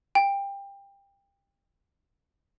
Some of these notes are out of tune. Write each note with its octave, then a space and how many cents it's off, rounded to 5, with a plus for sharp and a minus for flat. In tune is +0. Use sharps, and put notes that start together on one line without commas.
G5 +20